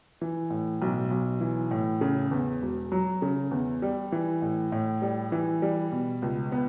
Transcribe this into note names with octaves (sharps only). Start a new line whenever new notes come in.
E3
A2
B1
B1
E3
A2
C#3
E2
E1
F#3
C#3
E2
G3
E3
A2
A2
G3
E3
G3
B2
C#2
B3